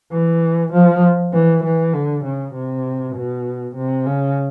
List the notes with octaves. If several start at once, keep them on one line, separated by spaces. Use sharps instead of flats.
E3
F3
E3
E3
D3
C#3
C3
B2
C3
C#3